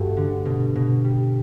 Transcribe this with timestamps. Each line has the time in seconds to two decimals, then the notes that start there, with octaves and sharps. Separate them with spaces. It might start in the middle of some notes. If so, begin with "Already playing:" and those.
Already playing: G2 A3 F#4
0.17 D3
0.45 B2
0.76 B2
1.04 G3